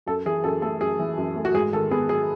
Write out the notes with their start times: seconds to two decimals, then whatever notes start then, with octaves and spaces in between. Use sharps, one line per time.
0.06 F#2 A4
0.26 E3 G#4
0.44 F#2 A4
0.62 A3 A4
0.81 F#2 G#4
0.99 E3
1.17 F#2
1.36 A3
1.45 F#4
1.54 G#2 G#4
1.73 D#3 A4
1.91 B3 G#4
2.09 F#3 G#4